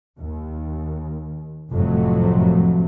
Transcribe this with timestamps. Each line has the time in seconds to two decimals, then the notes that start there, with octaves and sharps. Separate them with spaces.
0.19 D#2
1.71 F1 F2 A2 C3 F#3 A3